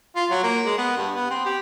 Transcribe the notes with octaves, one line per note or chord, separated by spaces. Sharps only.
F4
F#3
A#3
G#3
B3
G2
B3
C4
G4